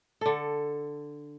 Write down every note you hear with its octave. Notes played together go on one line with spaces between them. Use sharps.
D3 A4